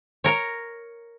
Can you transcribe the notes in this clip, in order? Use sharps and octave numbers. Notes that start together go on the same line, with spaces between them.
A#4 C#5